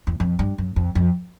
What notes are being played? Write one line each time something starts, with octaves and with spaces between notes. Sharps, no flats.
E2
F2
G2
F#2
F2
F2